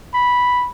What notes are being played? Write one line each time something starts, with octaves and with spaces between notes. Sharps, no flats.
B5